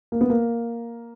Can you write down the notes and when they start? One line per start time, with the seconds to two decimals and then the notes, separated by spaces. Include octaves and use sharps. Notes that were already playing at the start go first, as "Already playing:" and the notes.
0.12 A#3
0.21 B3
0.30 A#3